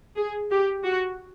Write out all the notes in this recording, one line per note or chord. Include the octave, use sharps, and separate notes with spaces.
G#4
G4
F#4